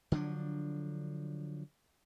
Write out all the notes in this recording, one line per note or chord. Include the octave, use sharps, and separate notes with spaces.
D3 F3 F#3 D4